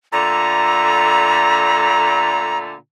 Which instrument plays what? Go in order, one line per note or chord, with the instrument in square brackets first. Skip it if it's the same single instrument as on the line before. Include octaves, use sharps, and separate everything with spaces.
[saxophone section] A#2 D3 A3 [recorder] A#5